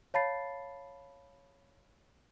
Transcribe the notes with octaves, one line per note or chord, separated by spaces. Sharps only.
C#5 F5 A5 B5 A6 C7